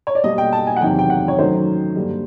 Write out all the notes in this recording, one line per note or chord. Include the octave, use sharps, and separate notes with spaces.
C#5
D5
B2 G3 A#3 D#5
G5
A5
G#5
F#5
E2 C3 D#3 F#3 G5
G5
F#5
C#5
F#2 D#3 F#3 A3 C5
G2 D3 G3 A#3